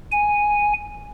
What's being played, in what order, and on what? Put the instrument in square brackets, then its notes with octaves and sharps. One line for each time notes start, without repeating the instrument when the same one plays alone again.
[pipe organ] G#5